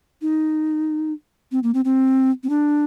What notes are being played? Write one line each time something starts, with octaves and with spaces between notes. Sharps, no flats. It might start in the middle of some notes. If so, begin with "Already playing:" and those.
D#4
C4
A#3
C4
C4
C4
D4